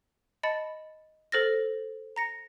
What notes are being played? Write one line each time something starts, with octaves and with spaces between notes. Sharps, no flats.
D#5 A5 B5 A6 C#7
A4 C5 F6 A6 A#6
A#5 A#6 C#7